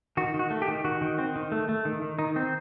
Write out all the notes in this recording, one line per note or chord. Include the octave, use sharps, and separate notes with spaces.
D#3 F#4
D#3
F#4
A3
G4
D#3
D#3 F#4
D#3
C4
D#3
A3
A3
D#3
D#3
D#3 D#4
C4